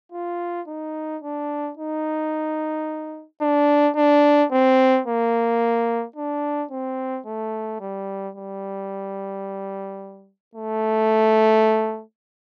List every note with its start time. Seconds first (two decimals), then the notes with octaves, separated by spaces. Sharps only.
0.12 F4
0.68 D#4
1.22 D4
1.77 D#4
3.42 D4
3.96 D4
4.52 C4
5.07 A#3
6.16 D4
6.71 C4
7.26 A3
7.80 G3
8.35 G3
10.55 A3